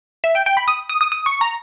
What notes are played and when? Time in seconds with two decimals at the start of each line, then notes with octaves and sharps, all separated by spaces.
0.24 E5
0.35 G5
0.46 G5
0.57 B5
0.68 D#6
0.89 D#6
1.01 D#6
1.12 D#6
1.26 C#6
1.41 A#5